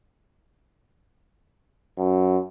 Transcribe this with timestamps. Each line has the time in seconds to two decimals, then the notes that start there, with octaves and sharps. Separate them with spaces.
1.98 F#2